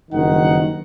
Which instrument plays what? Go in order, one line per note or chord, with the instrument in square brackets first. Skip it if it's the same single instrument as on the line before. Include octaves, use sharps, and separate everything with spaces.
[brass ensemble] F#1 G2 D#3 D#4 F#5